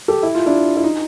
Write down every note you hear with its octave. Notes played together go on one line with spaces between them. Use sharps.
G4 A4
E4
F4
D4 E4
E4
D#4